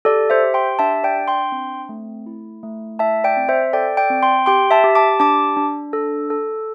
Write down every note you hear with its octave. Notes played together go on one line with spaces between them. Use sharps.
G4 A4 D5
C5 E5
G4
G5 C6
D4 E5 A5
D5 G5
D4
G5 C6
C4
A3
E4
A3
E4 E5 A5
D5 G5
C4
C5 E5
A4 D5 G5
D5 G5
C4
G5 C6
G4 G5 C6
E5 A5
G4
A5 D6
D4 A5 D6
D4
A4
A4